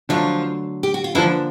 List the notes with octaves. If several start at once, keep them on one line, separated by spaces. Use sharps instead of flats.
D3 F3 F#3 A3 D4 F4
G4
F#4
F4
D3 E3 F3 A#3 D4 E4